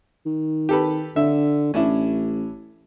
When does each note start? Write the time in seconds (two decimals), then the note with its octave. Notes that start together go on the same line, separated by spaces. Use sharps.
0.26 D#3
0.69 G4 A4 B4
1.16 D3 E5
1.74 A1 C#4 D4 E4